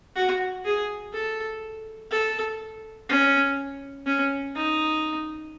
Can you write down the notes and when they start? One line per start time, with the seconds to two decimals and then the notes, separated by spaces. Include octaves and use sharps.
0.16 F#4
0.65 G#4
1.13 A4
2.11 A4
3.09 C#4
4.07 C#4
4.56 D#4